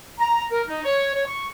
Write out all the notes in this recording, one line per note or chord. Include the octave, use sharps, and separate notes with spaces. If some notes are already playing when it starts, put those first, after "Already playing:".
A#5
A#4
D#4
C#5
C#5
C#6